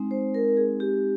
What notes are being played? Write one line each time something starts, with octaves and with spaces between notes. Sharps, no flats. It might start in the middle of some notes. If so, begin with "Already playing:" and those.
Already playing: G#3 C4 D#4
C5
A#4
G#4
G4